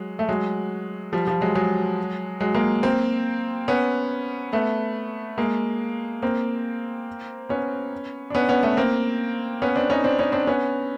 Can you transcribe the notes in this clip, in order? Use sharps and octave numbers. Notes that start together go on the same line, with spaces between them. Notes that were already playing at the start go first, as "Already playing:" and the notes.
Already playing: F#3 G#3
A3
F#3 G#3
F3 G3
F3 G3
F#3 G#3
F#3 G#3
F#3 G#3
G#3 A#3
A#3 C4
B3 C#4
A3 B3
G#3 A#3
A#3 C4
B3 C#4
D4
B3 C#4
B3 C#4
A3 B3
A#3 C4
B3 C#4
C4 D4
C#4 D#4
C4 D4
C#4 D#4
C4 D4
B3 C#4